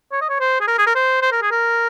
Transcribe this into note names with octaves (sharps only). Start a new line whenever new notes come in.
C#5
D#5
C#5
C5
G#4
A#4
G#4
A#4
C5
C5
A#4
G#4
A#4